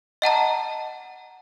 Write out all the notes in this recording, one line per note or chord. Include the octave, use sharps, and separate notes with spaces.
D#5 F#5 A5 A#5